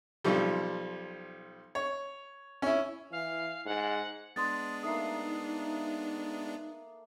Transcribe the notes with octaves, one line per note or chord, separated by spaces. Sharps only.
B1 F3 G3
C#5
C#4 E4
E3 F5
G#2 F#5
G#3 B3 D4 C6 D#6 A6
A3 A#3 D#4 D#6 C7